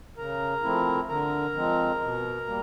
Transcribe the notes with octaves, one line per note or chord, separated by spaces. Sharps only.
C#3 A#4 A#5
F3 A3 C4 E4
D3 A#4 A#5
F3 G#3 C4
B2
G3 A#3